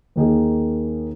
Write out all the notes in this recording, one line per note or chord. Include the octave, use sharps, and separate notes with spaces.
D#2 D#3 A#3 D#4 G#4